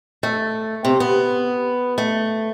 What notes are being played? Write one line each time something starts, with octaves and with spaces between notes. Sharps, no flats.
A3
C3
B3
A3